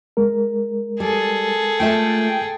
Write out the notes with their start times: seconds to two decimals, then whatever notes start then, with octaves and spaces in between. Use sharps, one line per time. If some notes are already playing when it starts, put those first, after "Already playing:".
0.17 G#3 A#4
1.00 G3 G#4 A4
1.80 A3 F4 E5 G5